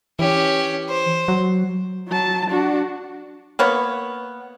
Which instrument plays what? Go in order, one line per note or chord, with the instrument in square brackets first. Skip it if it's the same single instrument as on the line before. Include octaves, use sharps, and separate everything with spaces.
[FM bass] E3 [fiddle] C#4 G4
[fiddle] C5
[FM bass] F#3
[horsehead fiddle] F#3 A5
D4 F#4
[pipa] A#3 B3 C#5